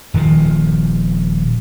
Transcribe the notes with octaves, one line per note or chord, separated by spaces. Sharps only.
D#1 D#3 F3